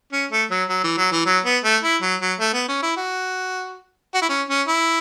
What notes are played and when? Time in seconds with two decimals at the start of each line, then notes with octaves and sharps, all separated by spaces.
0.12 C#4
0.31 A3
0.51 F#3
0.69 F#3
0.84 E3
0.98 F#3
1.12 E3
1.26 F#3
1.45 B3
1.64 A3
1.83 E4
2.02 F#3
2.21 F#3
2.40 A3
2.54 B3
2.68 C#4
2.83 E4
2.97 F#4
4.14 F#4
4.22 E4
4.29 C#4
4.49 C#4
4.68 E4